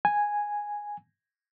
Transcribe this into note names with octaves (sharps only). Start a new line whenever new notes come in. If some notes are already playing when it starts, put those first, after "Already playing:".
G#5